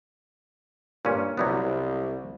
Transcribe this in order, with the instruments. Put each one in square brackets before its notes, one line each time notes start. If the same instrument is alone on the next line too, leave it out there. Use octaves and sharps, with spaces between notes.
[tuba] G2 [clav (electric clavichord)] A#2 C#4
[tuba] C2 [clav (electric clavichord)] F#3 G3 B3